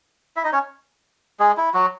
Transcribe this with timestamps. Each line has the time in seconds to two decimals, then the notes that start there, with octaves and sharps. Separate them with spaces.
0.36 E4 E5
0.44 D#4 D#5
0.53 C#4 C#5
1.40 G#3 G#4
1.57 E4
1.74 F#3 F#4